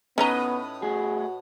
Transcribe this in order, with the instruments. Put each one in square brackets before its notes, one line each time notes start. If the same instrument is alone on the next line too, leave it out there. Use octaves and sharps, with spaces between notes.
[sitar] A2 B4 D#5 [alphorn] B3 [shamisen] C#4 D#4 A#5
[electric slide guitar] A3 G#4 [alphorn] F#4